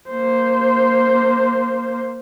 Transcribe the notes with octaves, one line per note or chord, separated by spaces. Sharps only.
A#3 C5